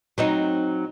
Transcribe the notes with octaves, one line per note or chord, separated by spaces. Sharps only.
F#3 C4 D#4